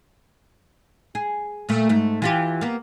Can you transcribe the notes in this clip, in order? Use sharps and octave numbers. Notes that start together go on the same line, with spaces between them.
G#4
A#2 A3
G#2 A3
E3 F4 G4
A#3 B3